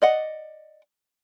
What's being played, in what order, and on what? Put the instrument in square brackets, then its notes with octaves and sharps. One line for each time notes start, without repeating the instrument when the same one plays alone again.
[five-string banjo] D5 D#5 F#5